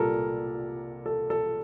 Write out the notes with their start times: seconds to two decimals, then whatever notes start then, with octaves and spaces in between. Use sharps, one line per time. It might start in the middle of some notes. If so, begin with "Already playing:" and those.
Already playing: C2 A#2 G3 A4 A#4
1.06 A4
1.30 A4